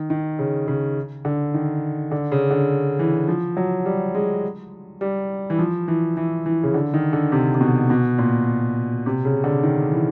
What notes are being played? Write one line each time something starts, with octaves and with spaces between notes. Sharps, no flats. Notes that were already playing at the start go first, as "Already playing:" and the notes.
Already playing: D#3
D#3
C#3
C#3
D3
D#3
D3
C#3
D3
E3
F3
F#3
G3
G#3
G3
E3
F3
E3
E3
E3
C#3
D3
D#3
D3
C3
C3
B2
B2
A#2
C3
C#3
D3
D#3
E3